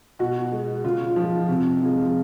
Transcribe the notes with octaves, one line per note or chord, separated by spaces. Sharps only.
B2 F#4
G#3
C#3 F4
F3 G#3
C3
F3 G#3